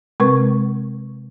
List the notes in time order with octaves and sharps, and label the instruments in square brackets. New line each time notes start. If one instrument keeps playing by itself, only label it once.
[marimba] C3 G#3 C4 A#4 B4 C#6